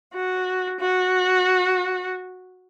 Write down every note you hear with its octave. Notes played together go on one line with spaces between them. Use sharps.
F#4
F#4